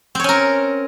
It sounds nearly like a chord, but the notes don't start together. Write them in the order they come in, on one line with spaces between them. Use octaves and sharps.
C4 C#5 C#4 A#4